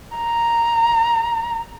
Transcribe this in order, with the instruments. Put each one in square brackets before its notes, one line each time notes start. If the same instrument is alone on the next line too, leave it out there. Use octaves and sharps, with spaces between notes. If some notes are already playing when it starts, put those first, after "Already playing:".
[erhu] A#5